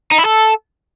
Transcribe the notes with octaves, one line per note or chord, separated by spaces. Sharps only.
D#4
E4
A4